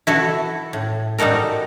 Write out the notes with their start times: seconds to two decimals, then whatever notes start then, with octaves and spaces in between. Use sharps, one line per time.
0.07 E4 F#4 A4
0.73 A2
1.18 G3 D#4 F#4 A4 A#4